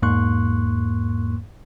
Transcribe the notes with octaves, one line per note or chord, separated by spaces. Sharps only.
E2 G#2 A#3 C6 C#6 F#6